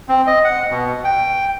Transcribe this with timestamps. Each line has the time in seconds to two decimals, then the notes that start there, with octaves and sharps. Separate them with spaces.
0.08 C4
0.27 D#5
0.44 F#5
0.70 B2
1.04 G5